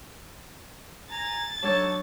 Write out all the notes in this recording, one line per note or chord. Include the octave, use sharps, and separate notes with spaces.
G#5 A#5 A6
F#3 D4 D#4 A4 C#5 A5